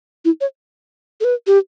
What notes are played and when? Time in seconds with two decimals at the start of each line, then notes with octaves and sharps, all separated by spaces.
0.25 E4
0.41 C#5
1.21 A4
1.24 B4
1.47 G4